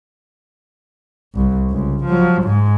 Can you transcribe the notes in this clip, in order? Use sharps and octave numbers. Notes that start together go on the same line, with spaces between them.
C2
C#2
F3 F#3
G#2 G#3